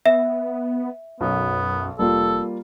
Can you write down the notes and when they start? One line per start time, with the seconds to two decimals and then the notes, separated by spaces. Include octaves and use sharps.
0.06 B3 E5
1.21 B1 F#2 B3
1.99 F1 G3 A#3 F4 A4